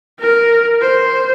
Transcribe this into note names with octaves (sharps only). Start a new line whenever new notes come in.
A#4
C5